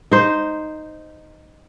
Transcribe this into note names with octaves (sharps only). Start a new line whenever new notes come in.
D#4 C5